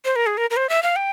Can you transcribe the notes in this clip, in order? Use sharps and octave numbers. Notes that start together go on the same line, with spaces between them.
C5
A#4
G#4
A#4
A#4
C5
E5
F5
G5